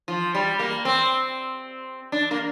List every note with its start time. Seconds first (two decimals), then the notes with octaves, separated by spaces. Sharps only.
0.08 F3
0.35 G3
0.59 A#3
0.85 C4
2.12 D4
2.31 A#3